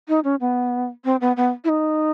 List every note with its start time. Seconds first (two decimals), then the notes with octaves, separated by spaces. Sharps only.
0.08 D#4
0.24 C#4
0.40 B3
1.05 C4
1.21 B3
1.37 B3
1.64 E4
1.69 D#4